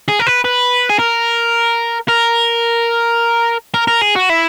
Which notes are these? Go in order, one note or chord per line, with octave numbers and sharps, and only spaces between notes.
G#4
A#4
B4
B4
G#4
A#4
A#4
A#4
A#4
G#4
F#4
E4